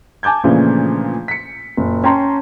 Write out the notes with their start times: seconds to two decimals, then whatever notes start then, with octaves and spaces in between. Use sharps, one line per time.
0.23 G#5 A5 D6 G6 G#6
0.44 A#2 C#3 E3 F3 A3 D4
1.28 B6 C#7
1.77 F#1 A#2
2.04 C#4 G5 A5 A#5 C6